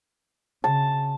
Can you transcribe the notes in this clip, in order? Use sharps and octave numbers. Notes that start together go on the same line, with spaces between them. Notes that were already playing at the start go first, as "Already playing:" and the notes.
C#3 A5